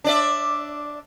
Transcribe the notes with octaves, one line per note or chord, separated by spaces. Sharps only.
D4 D5 E5